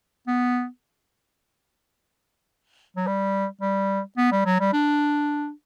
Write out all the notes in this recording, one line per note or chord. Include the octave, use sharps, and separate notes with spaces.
B3
F#3
G3
G3
B3
G3
F#3
G3
D4